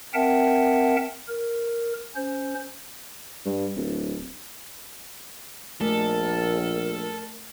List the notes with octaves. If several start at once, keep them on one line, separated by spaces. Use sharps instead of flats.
C4 A#4 E5 F#5 G5 A5
A#4
C#4 C5
G2
D1
A#1 A3 A4 A#4